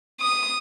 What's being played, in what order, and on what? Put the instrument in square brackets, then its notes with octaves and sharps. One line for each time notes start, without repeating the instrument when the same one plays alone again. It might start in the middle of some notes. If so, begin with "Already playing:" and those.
[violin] D#6